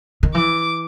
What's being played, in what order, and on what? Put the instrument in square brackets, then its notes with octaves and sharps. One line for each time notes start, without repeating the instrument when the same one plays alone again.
[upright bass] D#3
[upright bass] E3 [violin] D6